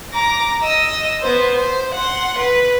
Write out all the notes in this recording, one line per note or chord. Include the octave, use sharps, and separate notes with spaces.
A#5 D6
D#5 E6
B3 C5
C5
F#5 C6
B4